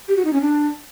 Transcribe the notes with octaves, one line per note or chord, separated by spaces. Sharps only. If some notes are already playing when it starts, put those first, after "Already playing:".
G4
F#4
D#4
C#4
D4